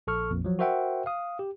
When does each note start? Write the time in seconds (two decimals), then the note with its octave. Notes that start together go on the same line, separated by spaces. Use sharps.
0.07 A#1 A4 C#6 F6
0.31 A#1 F2 A#2
0.44 F3 F#3
0.59 F#4 A#4 C5 E5 F#5 G5
1.06 F5 D#6
1.39 G4